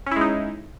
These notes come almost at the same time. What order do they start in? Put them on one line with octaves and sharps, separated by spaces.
C#4 E4 G#3 D#4